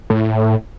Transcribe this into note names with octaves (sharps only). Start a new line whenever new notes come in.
A2